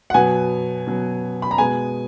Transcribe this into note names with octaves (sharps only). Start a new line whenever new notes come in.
F#5
B2 F#3 B3 G#5
B2 F#3 B3
B5
A#5
B2 G#3 B3 G#5